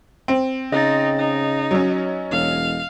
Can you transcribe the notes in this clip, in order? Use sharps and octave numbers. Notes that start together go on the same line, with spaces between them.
C4
C#3 D#4 D#5 A6
D#4
F#3 C#4
E1 F5